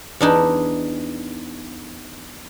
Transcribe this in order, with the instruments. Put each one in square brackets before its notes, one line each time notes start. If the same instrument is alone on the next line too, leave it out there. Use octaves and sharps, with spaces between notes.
[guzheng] E2 D4 D#4